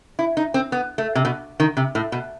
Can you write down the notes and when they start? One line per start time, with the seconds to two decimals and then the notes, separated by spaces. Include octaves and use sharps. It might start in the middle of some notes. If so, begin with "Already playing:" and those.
0.19 E4
0.37 D#4
0.54 C4
0.72 B3
0.98 A3
1.15 C3
1.25 B2
1.60 D#3
1.77 C3
1.95 A2
2.12 B2